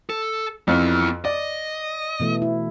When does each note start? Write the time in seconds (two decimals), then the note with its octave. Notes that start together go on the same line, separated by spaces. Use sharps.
0.10 A4
0.68 F2 B3 E4
1.25 D5 D#5
2.20 B2 E3 A3
2.42 E4